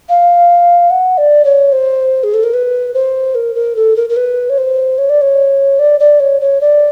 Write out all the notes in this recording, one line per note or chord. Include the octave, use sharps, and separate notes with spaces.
F5
F#5
D5
C#5
C5
G#4
A4
A#4
B4
C5
A#4
A#4
A4
A#4
A#4
B4
C#5
C5
C#5
D5
C#5
D5
D5
C#5
C#5
D5